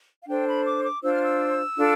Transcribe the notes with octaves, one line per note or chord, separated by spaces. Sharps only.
F5
D4 A4 C5 G5
B5
D6
D6
D4 F4 C5 E6
F6
E6
D4 F4 A4